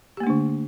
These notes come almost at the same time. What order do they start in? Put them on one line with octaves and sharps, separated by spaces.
G4 A#3 A3 D4 D3